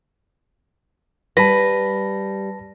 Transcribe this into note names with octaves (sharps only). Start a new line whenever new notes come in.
G3 B4 A5 A#6